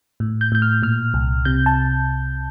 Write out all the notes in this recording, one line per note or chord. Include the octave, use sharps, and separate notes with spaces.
A2
G6
A2 G6
F6
A#2 F6
C2
C3 G6
A5